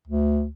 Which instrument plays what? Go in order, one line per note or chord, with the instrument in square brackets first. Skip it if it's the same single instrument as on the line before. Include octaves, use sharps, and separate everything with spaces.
[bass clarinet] D2